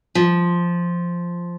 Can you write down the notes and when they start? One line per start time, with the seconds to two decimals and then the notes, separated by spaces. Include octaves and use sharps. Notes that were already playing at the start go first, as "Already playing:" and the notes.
0.15 F3